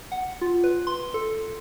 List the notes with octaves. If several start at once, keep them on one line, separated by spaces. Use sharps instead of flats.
F#5
F4
B4
C6
A4